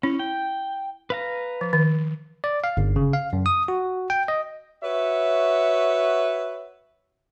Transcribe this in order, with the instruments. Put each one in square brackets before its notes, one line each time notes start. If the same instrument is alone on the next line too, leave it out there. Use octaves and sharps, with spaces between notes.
[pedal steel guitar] C#4 [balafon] E4
[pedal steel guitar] G5
B4 F5 A#5
[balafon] F3
D#3
[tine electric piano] D5
F5
G1
C#3
F5
F#2
D#6
F#4
G5
D#5
[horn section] F#4 B4 C#5 E5